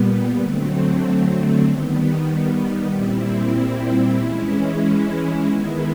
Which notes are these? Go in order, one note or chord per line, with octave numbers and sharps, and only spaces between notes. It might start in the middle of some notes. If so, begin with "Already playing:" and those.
Already playing: A#2 G3 B3
D3 F#3 A3 C4
D#3 G3 B3
A#2 G3 C4 E4
E3 G#3 C#4 E4
D#3 G#3 B3 E4